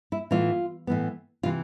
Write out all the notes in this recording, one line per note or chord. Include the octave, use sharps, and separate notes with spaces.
E4
A2 E3 B3 F4
A2 E3 B3
C3 E3 F4